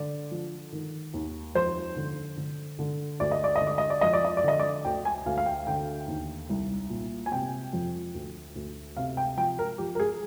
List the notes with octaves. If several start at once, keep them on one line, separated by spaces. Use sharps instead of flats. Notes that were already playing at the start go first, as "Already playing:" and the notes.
Already playing: D3 D5
F3
D#3
D#2
F2 C5
D3
D3
D3
D2 D5
D#5
D5
D3 D#5
D5
D#5
D5
F2 D#5
D5
D#5
D5
D3 D#5
D5
D2 G5
G#5
D2 F5
F5
G5
D3 G5
D#2
C2
A#2
G#5
C3 G5
F2
D2
D2
C3 F5
G5
F3 G5
A#4
F3 G4
A#4
G#4